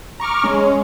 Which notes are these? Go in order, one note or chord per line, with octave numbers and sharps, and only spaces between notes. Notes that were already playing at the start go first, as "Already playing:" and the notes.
A#5 C#6 D6 F6
G#3 C#4